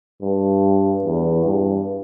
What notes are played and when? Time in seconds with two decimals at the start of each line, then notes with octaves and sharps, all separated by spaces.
0.21 G2
1.04 E2
1.45 G2